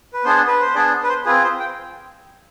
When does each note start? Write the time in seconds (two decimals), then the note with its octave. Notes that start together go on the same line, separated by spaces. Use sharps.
0.13 B4
0.24 B3 D4 G#4 C5
0.47 B4
0.61 C5
0.75 B3 D4 G#4 D5
1.03 B4
1.09 C5
1.25 C4 F4 G#4 B4
1.43 C5
1.59 G5